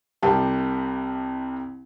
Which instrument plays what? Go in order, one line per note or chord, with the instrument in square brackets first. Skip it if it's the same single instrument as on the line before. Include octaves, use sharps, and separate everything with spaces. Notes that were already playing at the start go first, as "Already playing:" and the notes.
[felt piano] C2 C3 G4 A5